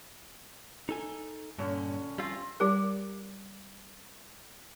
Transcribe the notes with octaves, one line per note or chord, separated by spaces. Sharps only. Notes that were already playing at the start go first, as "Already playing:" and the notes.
D#4 A4 G#5
G2 A#2 D3 C#4
G3 C4 F4
G3 G4 A#4